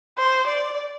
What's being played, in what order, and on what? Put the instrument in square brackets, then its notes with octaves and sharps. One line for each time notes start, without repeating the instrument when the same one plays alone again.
[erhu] C5
D5